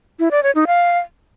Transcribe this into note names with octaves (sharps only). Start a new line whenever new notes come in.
E4
D5
C#5
D#4
F5